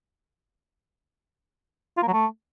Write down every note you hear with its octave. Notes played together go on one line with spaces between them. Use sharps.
F4
A#3
F#3
A3